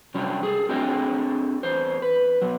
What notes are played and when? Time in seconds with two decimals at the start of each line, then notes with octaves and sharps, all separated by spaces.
0.14 C3 F#3 G3 C#4 D4
0.43 G#4 A4
0.69 C4 D4 F#4 G#4 A4 D#5
1.63 E2 C5
2.02 B4
2.42 F#3 B3